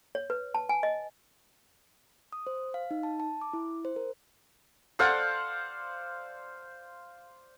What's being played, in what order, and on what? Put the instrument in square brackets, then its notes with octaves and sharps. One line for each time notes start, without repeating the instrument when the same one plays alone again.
[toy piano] C#5
B4
A5
G#5
D#5
[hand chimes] D#6
C5
F5
D#4
A5
A5
D6
E4
C5
A#4
[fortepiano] A4 F#5 F6 [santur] C5 D5 F5